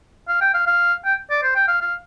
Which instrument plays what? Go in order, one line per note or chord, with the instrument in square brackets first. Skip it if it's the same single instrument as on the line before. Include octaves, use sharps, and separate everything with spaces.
[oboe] F5
G5
F5
F5
G5
D5
C5
G5
F5
F5